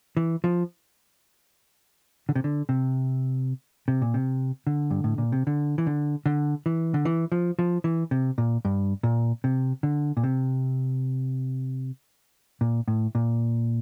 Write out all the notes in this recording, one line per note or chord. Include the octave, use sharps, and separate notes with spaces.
E3
F3
D3
C3
D3
C3
C3
A#2
C3
D3
G2
A2
A#2
C3
D3
E3
D3
D3
E3
D3
E3
F3
F3
E3
C3
A#2
G2
A#2
C3
D3
A#2
C3
A#2
A2
A#2